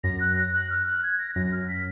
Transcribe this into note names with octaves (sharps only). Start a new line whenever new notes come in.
F#2 A#6
F#6
A#6
F#6
F6
F#6
G#6
A#6
F#2 A#6
F6
B6